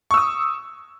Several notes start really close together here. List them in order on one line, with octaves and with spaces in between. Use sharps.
C#6 E6 D#6